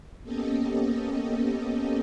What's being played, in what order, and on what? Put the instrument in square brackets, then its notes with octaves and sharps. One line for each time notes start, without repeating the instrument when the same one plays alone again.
[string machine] A#3 B3 C#4 G4 A4 D#5